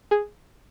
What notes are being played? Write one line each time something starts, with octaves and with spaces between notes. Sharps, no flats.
G#4